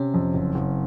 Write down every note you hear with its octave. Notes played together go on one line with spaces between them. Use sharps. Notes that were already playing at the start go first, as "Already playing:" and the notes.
Already playing: C3 C4 C#4
F2
F#1
F#1